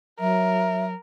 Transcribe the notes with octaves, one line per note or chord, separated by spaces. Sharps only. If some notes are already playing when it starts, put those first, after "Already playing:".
F#3 A#4 E5